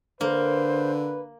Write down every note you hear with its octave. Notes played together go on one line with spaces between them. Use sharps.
D3 A#3 B4 C5